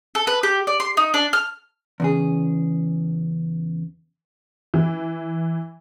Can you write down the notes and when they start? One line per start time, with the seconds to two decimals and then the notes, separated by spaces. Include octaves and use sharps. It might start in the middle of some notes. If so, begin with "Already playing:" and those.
0.15 A4
0.27 B4
0.43 G4
0.67 D5
0.80 C6
0.97 D#4
1.14 D4
1.33 F6
2.00 E2 C#3 G#4
4.74 E3